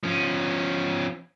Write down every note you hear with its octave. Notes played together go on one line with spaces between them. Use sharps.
F3 C#4